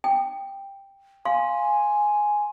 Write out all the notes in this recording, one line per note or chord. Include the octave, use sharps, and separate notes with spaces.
G5
F5 G#5 C6